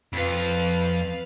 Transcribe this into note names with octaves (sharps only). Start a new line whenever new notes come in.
F2 B4 F5